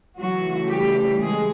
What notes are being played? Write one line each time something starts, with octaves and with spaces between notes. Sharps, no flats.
C#3 E3 F#3 A3 F#4
G3 G4
G#3 G#4